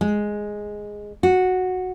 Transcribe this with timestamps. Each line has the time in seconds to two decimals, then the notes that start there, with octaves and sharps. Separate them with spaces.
0.01 G#3
1.23 F#4